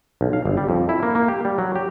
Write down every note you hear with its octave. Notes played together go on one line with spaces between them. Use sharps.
B1
F5
G1
G3
F2
E4
A#3
A#3
G4
G3
F#3
G4